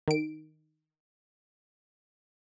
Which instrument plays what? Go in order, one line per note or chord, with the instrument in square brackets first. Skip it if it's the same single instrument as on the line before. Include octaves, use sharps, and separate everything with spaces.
[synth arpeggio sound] D#3 D7